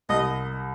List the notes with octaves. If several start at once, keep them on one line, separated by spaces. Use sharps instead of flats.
C2 D#5